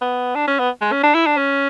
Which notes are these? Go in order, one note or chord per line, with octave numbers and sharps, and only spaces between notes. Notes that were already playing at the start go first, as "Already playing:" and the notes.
B3
D4
C#4
B3
G#3
C#4
D4
E4
D4
C#4